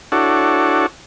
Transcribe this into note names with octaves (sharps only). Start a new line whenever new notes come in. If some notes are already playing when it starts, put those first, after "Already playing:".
D4 E4 F#4 A4 C#5